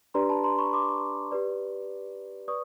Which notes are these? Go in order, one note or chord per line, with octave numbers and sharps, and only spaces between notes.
D4 G4 B4 D5 A#5 C6
A5 B5
A#5 C6
B5 C#6
C6 D6
G4 B4 D5
B4 D5 C#6 D#6